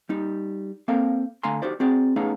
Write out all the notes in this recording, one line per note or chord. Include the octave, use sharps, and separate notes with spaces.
G3 D#4
A#3 C4 A4 A#4 F5
D3 A3 F5 G#5 A#5 C6
D#4 F#4 G4 C5 D5
C4 F#4 G#4 D5
A3 B3 C#4 D#4 G#4 F5